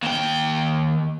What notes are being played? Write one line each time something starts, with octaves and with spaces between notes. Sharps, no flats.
D#2 G5